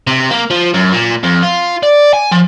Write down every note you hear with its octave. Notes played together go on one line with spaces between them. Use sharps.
C3
A#3
F3
F#2
A#2
F2
F4
D5
G#5
F3